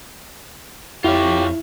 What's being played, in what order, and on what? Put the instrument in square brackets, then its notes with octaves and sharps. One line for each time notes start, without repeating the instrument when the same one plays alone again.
[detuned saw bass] F2 [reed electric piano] E4 [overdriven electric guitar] F4 C#5 [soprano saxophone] G4